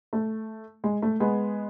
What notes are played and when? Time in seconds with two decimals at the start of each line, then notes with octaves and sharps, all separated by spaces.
0.13 A3
0.84 G#3
1.02 A3
1.20 G#3 B3